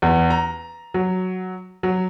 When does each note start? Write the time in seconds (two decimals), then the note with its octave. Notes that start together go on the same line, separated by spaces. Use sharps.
0.02 E2
0.30 A#5
0.94 F#3
1.83 F#3